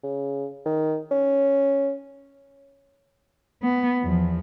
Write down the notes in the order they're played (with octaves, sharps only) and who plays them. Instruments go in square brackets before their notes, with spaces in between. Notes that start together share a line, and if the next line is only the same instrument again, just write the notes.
[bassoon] C#3
D#3
C#4
[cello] B3
E2 F3